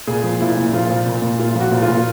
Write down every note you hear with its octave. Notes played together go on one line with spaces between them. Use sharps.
A#2 G#4
F3
A#2 E4
A#2
F3 F4
A#2
A#2
A#2
A#2 F4
F3 F#4
A#2
F4
A#2